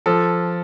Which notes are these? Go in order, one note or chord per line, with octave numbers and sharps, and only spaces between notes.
F3 A4